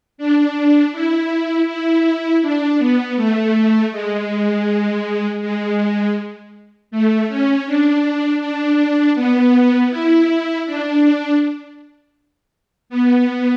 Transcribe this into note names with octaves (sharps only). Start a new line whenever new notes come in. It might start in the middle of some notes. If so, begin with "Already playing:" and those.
D4
E4
E4
D4
B3
A3
G#3
G#3
A3
C#4
D4
D4
B3
E4
D4
B3